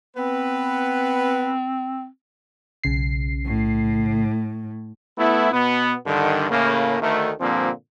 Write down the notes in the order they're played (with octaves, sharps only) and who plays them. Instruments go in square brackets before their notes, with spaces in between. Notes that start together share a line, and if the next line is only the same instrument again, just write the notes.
[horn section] B3 B4 [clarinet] C4
[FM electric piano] B1 C#3 C7
[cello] A2
[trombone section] A3 B3 E4
B2 B3
G2 D3 D#3
A2 C#3 A#3
D2 D#3 A3
G2 A#2 D3 F3 A#3 C4